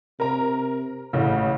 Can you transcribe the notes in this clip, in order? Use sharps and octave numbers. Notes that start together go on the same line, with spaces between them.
C3 A#4 A#5
A1 A2 C#3